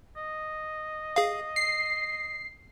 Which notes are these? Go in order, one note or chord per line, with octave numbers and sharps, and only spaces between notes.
D#5
G#4 F5
C7